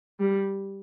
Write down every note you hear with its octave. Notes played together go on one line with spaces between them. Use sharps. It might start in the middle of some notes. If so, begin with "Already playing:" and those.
G3